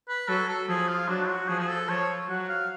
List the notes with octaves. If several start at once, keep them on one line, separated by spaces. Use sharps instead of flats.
B4
F#3 A4
A4
F3 G#4
F4
F#3 D4
F#4
F3 G#4
G#4
A4
F3 C#5
F#3 F#5
F5